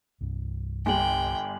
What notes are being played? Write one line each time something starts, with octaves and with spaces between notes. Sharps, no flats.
C2 G2
G1 G3 G5 G#5 F#7